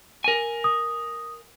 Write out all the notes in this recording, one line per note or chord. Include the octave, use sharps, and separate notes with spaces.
A#4 G#5
D#6